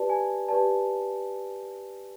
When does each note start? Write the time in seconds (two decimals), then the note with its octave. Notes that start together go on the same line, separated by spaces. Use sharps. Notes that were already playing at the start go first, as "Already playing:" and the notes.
Already playing: G4 B4 D5 A5
0.10 G#5
0.48 G4 B4 D5 A5